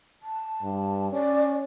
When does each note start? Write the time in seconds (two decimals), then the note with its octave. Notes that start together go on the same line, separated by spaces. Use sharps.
0.23 A5
0.63 G2
1.13 C#4 D5